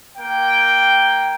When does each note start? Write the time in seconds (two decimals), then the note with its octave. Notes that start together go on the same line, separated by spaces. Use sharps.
0.16 A#3 G5